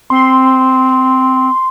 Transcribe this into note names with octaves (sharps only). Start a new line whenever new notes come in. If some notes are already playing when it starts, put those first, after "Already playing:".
C4 C6